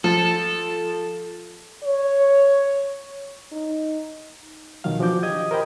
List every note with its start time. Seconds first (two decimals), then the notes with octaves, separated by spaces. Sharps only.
0.04 F3 A4
1.84 C#5
3.52 D#4
4.84 B2 D#3 F3 F#3 F5
5.00 E3 F3 D4 F#4 D6 G6
5.23 G4 D#5 D#6 G#6
5.51 A#4 C5 D#5 G5 B5